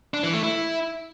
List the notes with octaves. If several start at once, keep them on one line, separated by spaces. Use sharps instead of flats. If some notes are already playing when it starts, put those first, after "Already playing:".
D4
E3
A3
E4